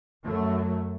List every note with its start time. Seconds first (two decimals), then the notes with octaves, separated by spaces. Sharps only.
0.23 F#2 F#3 A3